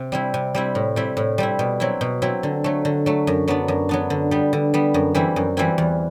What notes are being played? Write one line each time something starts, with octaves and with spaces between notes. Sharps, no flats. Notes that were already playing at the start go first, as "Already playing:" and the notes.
Already playing: C3
G3 C4 E4
C3
G3 C4 E4
A2
G3 C4 E4
A2
G3 C4 E4
B2
F#3 C4 E4
B2
F#3 C4 E4
D3
F#3 A3
D3
F#3 A3
F#2
F#3 B3 D4
F#2
F#3 B3 D4
D3
G3 B3
D3
G3 B3
F#2
E3 G3 C4 E4
F#2
E3 G3 C4 E4
E2